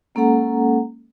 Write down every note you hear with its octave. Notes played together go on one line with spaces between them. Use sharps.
G#3 A#3 C#4 A4 F#5 A#5